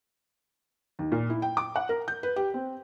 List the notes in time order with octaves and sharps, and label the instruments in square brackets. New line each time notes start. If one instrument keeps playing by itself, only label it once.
[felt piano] D#2
A#2
E4
G5
D6
F#5
A#4
G6
B4
G4
C4